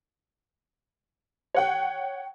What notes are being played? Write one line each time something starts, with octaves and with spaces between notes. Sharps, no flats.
C#5 F#5 G5